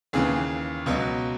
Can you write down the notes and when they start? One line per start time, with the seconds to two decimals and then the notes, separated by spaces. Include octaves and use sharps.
0.13 D#2 C#3 E3 G#4
0.86 C#2 B2 F#3